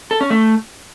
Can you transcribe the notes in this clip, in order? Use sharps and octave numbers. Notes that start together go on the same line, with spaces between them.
A4
C#4
A3